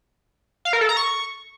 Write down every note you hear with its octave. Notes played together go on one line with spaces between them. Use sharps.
F5
A#4
A4
A#5
C#6